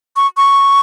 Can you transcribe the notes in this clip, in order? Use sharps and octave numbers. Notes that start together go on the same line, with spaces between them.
C#6
C#6